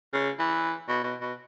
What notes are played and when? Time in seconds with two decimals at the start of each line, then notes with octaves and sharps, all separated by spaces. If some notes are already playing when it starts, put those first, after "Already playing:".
0.13 C#3
0.39 E3
0.88 B2
1.04 B2
1.21 B2